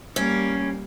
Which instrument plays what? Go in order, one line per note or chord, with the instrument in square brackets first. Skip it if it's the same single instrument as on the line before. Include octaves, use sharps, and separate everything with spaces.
[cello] G3 A#3 [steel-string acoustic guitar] C#4